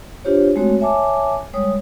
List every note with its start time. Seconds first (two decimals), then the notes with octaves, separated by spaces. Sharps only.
0.25 D4 F4 G4 C5 C#5
0.56 G#3 A3 C4 F#4 C#5
0.80 C#5 E5 G#5 A5 D6
1.53 G3 G#3 C#5 D#6